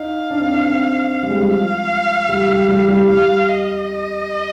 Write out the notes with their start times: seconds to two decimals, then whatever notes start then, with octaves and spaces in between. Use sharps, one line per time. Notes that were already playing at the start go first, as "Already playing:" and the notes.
Already playing: D#4 F5
0.30 D4
0.40 C4
0.52 D4
0.70 C4
1.23 G3
1.30 G#3
1.37 G3
1.50 F3 F5
2.29 G3
2.48 G3
2.69 G3
2.88 G3
3.08 G3 F5
3.48 D#5